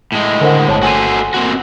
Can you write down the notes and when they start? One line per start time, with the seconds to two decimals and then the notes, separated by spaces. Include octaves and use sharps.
0.12 A2 G#3
0.41 D3 A#4 C5 F#5
0.68 G1 C#5 A5
0.83 F#4 A4 C5 G#5 D#7
1.34 A#3 C4 F#4